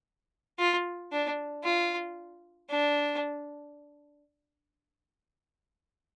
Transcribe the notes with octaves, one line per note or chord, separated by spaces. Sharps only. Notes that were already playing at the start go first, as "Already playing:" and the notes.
F4
D4
F4
D4